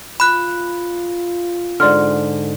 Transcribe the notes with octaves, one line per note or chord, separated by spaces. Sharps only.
F4 B5 F#6
G#2 D3 D5 C6 F6